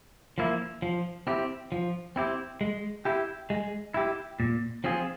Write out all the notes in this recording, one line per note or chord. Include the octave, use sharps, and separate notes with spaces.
F3 A#3 E4
F3
C4 E4 G4
F3
C4 E4 G4
G#3
E4 G4
G#3
E4 G4
A#2
F3 C4 F4 G#4